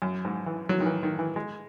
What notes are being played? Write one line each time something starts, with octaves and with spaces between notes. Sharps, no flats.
F#2
G#2
E3
F#3
D#3
E3
D#3
E3
G#3